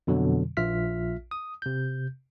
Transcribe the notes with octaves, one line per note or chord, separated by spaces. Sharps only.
F2 B2 D3 F#3
A#1 F4 E5 F6 B6
D#6
C3 G6